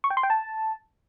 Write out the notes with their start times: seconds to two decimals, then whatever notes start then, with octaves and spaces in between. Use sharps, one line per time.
0.04 C#6
0.10 G5
0.17 C6
0.23 G5
0.30 A5